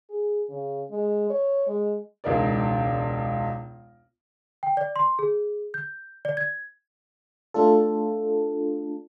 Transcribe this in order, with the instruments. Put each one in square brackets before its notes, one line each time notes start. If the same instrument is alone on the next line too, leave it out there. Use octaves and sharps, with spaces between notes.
[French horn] G#4
C#3
G#3
C#5
G#3
[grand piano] E1 C#2 D#4 A#4 D5
[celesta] G5
D5
C6
G#4
G6
D5
G#6
[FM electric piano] A3 D4 F4 A4